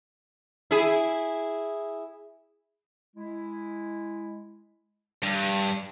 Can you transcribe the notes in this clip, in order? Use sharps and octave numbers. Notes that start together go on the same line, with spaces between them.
E4 G#4
G#3 E4
G2